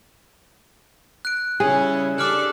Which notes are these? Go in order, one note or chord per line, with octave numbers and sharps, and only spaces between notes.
F#6 D7
C#3 G3 C#4 E4 G#4
D4 G4 A4 D5 D6 F6 F#6